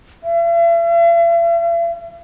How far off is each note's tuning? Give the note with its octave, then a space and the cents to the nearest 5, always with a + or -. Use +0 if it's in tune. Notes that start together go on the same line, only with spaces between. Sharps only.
E5 +45